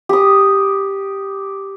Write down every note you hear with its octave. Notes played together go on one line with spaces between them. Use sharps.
G4 D#6